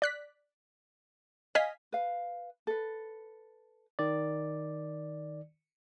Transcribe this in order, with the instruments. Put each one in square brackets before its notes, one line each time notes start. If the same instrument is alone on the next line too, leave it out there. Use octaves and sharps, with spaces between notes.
[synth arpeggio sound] D5 F#6 B6
[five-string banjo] D#5 [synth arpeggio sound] F5 G#5 B6
[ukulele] B4 F5
A4 B4
[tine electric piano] D#3 D5